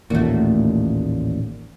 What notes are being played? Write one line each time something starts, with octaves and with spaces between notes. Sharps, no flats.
A1 D#2 A#2 A3 F#4